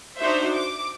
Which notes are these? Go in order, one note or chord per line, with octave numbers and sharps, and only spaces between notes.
D4 D#4 F#4 C5 E5
D6